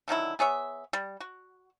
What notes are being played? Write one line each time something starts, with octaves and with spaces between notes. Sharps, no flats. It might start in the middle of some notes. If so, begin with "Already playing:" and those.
D3 D#3 F#3 E4
B3 G#4 C#5 E5
G3
F#4